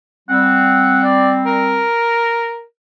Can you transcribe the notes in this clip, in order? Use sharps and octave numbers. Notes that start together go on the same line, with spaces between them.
G3 C4 F#5
D5
A#4